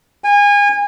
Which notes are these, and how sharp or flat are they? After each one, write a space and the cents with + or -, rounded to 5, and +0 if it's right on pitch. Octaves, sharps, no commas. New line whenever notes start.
G#5 -30